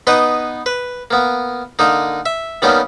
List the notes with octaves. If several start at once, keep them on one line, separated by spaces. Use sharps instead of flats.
B3 D#4 B4 D#5
B4
A#3 B3
D3 A#3 D#4
E5
D#3 G3 A#3 B3 C#4